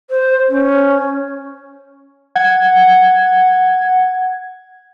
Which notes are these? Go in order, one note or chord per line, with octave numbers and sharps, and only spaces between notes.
C5
C#4
F#5 G#6